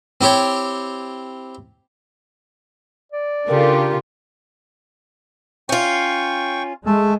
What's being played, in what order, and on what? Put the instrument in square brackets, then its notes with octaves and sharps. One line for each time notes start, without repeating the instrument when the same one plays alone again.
[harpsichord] C4 E4 G4 C#5
[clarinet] D5
[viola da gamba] C#3 [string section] D4 F4 G4 [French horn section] A4 A#4
[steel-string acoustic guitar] C#4 F4 [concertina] G5 C#6
[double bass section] G#3 [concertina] A3 A4